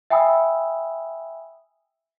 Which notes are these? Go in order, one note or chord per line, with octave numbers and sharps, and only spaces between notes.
E5 G5 G#5 B5 D#6 E6